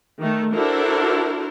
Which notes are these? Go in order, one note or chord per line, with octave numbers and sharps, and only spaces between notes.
D#3 A3
D4 E4 F#4 A4 A#4 C5